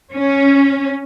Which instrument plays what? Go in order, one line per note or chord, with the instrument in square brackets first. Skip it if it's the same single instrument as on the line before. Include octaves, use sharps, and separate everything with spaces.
[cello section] C#4